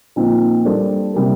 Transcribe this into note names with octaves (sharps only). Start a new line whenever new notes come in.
A#2 F3 C4 D#4
G3 A#3 D4 A4 C5
C3 G3 A#3